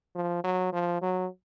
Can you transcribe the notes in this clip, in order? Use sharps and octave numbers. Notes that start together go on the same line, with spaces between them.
F3
F#3
F3
F#3